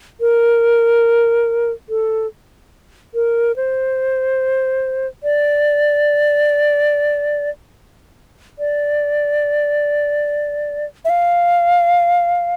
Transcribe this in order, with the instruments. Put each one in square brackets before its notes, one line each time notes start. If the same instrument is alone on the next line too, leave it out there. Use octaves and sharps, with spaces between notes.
[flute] A#4
A4
A#4
C5
D5
D5
E5
F5